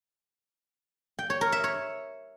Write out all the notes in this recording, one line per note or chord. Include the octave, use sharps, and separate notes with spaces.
G5
C#5
A#4
E5
C#5